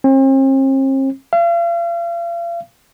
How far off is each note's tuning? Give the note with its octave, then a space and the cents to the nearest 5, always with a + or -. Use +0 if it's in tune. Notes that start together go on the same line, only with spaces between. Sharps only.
C4 +45
F5 -40